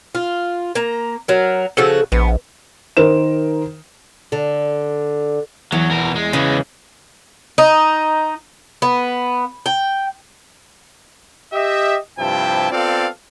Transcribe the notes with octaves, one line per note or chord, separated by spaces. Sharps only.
F4
A#3 A#5
F#3 A#4
C#3 F3 F#4 A4
A#1 B3
D#3 A#4 C5 E7
D3
E2 F#3
B2 A#4
G#3
C#3 E3 G#3
D#4
B3
G5
G4 D#5 E5
G2 C3 F3 E4 G5 A5
B3 C4 F4 A4 D5 F5